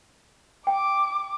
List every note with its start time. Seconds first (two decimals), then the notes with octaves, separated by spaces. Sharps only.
0.67 G5 D6